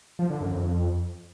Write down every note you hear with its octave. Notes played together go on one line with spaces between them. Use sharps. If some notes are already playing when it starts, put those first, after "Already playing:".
F3
D3
F#2
F2